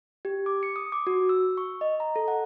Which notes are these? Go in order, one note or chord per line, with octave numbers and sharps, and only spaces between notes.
G4
D6
C#7
D#6
D6
F#4
E6
C#6
D#5
A#5
A4
F#5